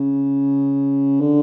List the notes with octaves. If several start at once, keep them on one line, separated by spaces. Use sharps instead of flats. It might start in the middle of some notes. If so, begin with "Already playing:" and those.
Already playing: C#3
D3